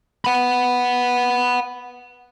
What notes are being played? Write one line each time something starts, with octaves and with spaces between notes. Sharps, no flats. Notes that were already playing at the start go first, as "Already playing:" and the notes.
F#5 B5